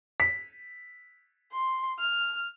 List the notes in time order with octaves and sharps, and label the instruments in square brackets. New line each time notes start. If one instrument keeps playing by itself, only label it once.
[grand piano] B6
[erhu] C6
F6